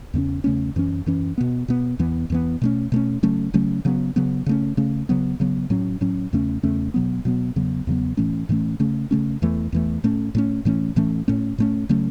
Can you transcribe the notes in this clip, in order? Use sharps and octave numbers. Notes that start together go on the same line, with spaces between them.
E2 C#3 A3 C#4
E2 C#3 A3 C#4
F#2 E3 C#4
F#2 E3 C#4
B2 B3
B2 B3
E2 E3 B3
E2 E3 B3
B2 A3 C#4
B2 A3 C#4
C#3 F#3 A3 C#4
C#3 F#3 A3 C#4
C#3 F#3 B3
C#3 F#3 B3
C#3 A3 C#4
C#3 A3 C#4
C#3 F#3 B3
C#3 F#3 B3
A2 F#3 C#4
A2 F#3 C#4
E2 C#3 A3 C#4
E2 C#3 A3 C#4
B2 F#3 B3
B2 F#3 B3
E2 C#3 F#3 B3
E2 C#3 F#3 B3
A2 E3 A3 C#4
A2 E3 A3 C#4
C#3 A3 C#4
C#3 A3 C#4
E2 E3 A3
E2 E3 A3
A2 A3 C#4
A2 A3 C#4
A2 E3 A3 C#4
A2 E3 A3 C#4
A2 A3 C#4
A2 A3 C#4
C#3 F#3 A3 C#4